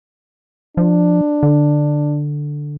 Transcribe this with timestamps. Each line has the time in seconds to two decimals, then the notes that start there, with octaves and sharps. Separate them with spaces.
0.77 F3 D4
1.43 D3